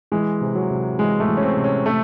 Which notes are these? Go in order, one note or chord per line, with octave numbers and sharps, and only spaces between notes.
E3 G#3
C3
F#3
C3
E3 G#3
A3
E3
C#4
C4
C3
C#4
C3 A3